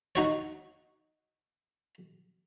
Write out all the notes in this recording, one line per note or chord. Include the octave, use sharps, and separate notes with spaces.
D#4 F#4 C#5